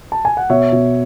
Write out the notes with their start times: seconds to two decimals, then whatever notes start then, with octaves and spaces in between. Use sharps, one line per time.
0.12 A5
0.25 G#5
0.37 F#5
0.49 B2 C#5 E5
0.72 B2